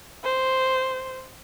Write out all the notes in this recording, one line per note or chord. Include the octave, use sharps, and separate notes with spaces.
C5